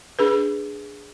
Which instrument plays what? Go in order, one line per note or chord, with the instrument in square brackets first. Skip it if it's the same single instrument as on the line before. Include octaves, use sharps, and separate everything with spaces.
[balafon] D4 G#4 B4